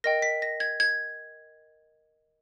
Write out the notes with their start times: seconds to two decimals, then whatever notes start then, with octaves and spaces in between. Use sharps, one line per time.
0.04 A#4 D#5 G5 A#6
0.22 B6
0.42 A#6
0.60 G#6
0.80 G#6